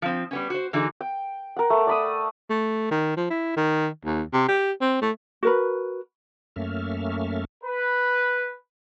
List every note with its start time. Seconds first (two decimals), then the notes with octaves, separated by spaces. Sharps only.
0.02 F3 C4
0.31 G3 B3 C#4
0.50 F#4 C5
0.73 D3 E3 D#4 F#4 G#4
1.01 G5
1.56 A#4 F#5
1.70 A3
1.87 D5 B5 D#6
2.50 A3
2.91 D#3
3.17 F3
3.30 E4
3.57 D#3
4.05 D#2
4.33 C3
4.49 G4
4.81 C4
5.02 A3
5.43 F#4 A#4 B4
6.56 F#2 A3 A#3 C#4 E5 F6
7.63 B4